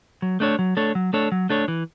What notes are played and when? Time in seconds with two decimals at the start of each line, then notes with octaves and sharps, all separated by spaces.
0.22 F#3
0.40 A3 D4 A4 C#5
0.59 F#3
0.77 A3 D4 A4 C#5
0.95 F#3
1.13 A3 D4 A4 C#5
1.32 F#3
1.49 A3 D4 A4 C#5
1.68 E3